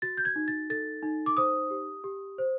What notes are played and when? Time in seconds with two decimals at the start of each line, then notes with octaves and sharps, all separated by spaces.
0.02 F#4 A6
0.17 G6
0.25 G#6
0.36 D#4
0.48 A6
0.70 A4 A6
1.03 D#4
1.26 D6
1.37 C5 D#6
1.71 G4
2.04 G4
2.38 C5